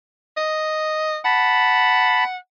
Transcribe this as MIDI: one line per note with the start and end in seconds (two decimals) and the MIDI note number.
0.37 1.19 75
1.25 2.37 78
1.25 2.24 81
1.25 2.24 83